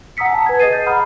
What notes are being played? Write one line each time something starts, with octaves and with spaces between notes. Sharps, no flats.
F#5 A#5 D#6 E6 B6 C#7
G#5 A5
B4 G#6
G#4 D#5 D#6 A6 C7 D#7
G6
F#5 A#5 B5 D#6 F6